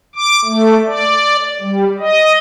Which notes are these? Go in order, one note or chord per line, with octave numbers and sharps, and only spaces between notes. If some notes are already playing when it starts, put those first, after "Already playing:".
D6
A3
D5
G3
D#5